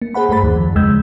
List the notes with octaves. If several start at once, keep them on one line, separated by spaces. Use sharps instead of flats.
A#3
G#4 C5 F#5 B5
G2 A3 G#4 C5 B5 A6
D#2 D#3
F#2 F3
E2 C#3 G#3 E6 G6 G#6